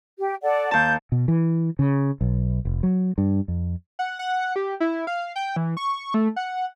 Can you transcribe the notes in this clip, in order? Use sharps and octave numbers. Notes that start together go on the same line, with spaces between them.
G4
A4 D5 F#5
D#2 A5 G6
B2
E3
C#3
B1
F1
F#3
G2
F2
F#5
F#5
G4
E4
F5
G5
E3
C#6
A3
F#5